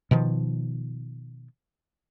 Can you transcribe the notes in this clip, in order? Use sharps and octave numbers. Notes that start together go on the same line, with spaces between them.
B2 D#3 F3